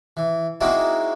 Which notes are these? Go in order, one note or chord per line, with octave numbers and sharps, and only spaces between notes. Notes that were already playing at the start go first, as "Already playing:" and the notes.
E3
G#3 A#3 C4 D#4 E4 F#4